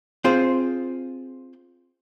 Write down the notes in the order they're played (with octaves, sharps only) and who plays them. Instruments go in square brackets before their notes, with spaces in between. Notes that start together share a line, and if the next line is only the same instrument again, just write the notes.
[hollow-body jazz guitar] C4 F4 G#4 C5